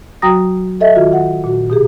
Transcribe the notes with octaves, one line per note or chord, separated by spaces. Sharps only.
F#3 F#4 G5 A#5 D#6 A#6
A4 D#5 E5
D#3 F4 F#4
F#5
A#2 F#4
B2 G4 G#4